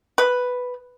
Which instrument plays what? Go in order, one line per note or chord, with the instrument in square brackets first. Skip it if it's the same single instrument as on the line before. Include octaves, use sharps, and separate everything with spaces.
[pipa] B4